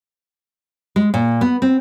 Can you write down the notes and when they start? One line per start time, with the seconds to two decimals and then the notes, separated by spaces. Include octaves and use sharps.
0.96 G#3
1.14 A#2
1.41 B3
1.62 C4